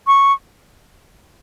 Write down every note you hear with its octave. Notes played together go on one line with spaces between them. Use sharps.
C#6